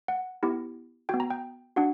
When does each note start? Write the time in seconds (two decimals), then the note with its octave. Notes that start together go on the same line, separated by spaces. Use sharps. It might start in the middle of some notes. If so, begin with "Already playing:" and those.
0.08 F#5
0.43 B3 E4 G4
1.09 B3 F#4 G5
1.20 A#5
1.30 G5
1.76 D4 F#4 F#5